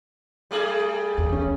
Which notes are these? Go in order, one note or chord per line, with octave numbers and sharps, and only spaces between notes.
G3 A3 G#4
E2
C#4